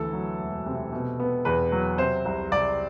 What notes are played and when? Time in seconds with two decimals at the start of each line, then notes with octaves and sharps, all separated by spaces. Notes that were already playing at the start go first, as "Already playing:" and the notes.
Already playing: D2 E3 A4
0.13 F#3
0.40 E1
0.66 C3
0.93 B2
1.20 B3
1.45 E2 B4
1.72 F#3
1.98 C3 C5
2.25 C2
2.52 C2 D5